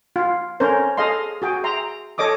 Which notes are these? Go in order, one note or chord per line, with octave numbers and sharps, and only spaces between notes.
F4
C#4 A4 A#4 C5
G#4 A4 D#5 F5 C6
F#4 G#4 G5
E5 G5 A#5 C6
A4 C#5 D#5 D6 D#6